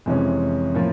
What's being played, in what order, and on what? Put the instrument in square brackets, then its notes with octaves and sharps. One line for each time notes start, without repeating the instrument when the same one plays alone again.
[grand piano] F2 C3 E3 G#3 C#4
A2 F3 A#3 C#4 F4